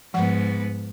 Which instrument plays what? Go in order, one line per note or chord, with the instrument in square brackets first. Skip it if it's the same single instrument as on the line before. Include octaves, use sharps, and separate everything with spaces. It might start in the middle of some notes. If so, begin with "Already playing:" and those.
[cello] G#2 B3 [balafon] F3 F#5